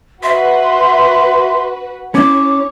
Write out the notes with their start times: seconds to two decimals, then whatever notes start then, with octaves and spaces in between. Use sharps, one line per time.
0.23 F#4 B4 E5 C6
2.15 C#4 E4 C#5 D6